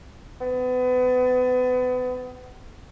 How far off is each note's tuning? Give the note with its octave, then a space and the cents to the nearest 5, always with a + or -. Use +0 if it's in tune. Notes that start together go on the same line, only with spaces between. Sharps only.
B3 +30